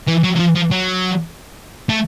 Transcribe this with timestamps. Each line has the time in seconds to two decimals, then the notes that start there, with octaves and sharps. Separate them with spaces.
0.08 E3
0.24 F#3
0.36 F#3
0.39 F3
0.56 F3
0.71 F#3
1.89 A3